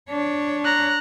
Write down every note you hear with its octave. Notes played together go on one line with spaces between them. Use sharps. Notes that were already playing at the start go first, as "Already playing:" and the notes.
D4 C#5
A#5 F#6